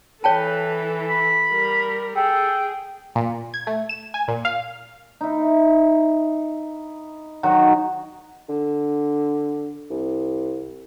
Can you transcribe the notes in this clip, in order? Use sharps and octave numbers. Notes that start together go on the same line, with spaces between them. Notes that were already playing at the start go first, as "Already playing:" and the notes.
E3 A4 B4 C#5 G5 A5
B5
G3 A#4
G#4 A4 G5
A#2
G#6
A3
E7
G#5
A#2
F5
D#4 E4
D#3 F#3 F#4
D3
C2